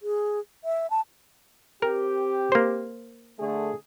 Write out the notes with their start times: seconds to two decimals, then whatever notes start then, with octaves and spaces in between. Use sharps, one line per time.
0.02 G#4
0.64 E5
0.90 A5
1.82 C4 G4 A#4
2.52 A#3 C5
3.39 D3 A3 G#4